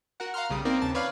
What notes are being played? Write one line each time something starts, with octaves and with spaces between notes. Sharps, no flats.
F#4 A#4 F#5
F5 F#5 A#5 C6 F6
B1 C#3 G3 D#6
A#3 C4 D#4 A#4 D5
D#2 C#3 A5
B4 C#5 D5 F5